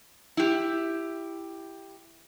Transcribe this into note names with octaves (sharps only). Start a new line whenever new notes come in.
E4 G4